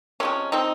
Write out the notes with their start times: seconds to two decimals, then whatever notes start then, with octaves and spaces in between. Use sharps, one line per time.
0.20 C3 F3 G#3 C#4
0.52 C4 D#4